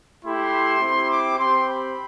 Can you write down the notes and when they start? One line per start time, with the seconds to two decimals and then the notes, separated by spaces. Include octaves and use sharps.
0.25 A3 E4 G4 C6
0.81 C4 E4 G4
1.10 D6
1.38 C4 G4 C6
1.66 B5